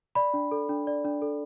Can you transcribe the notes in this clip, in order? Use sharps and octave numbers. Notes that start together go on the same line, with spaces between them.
D5 B5
D4
A4
D4
D5
D4
A4